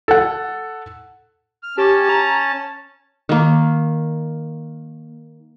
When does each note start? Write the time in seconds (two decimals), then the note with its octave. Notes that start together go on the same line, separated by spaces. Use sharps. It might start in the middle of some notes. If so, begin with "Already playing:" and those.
0.08 A4 F#5
1.63 F6
1.78 C#4 G4 A5
2.09 A#5
3.29 D#3 A#3